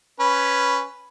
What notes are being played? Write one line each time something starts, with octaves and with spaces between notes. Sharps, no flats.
C#4 B4